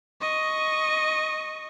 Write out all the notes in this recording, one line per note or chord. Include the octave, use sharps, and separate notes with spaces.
D#5 C#6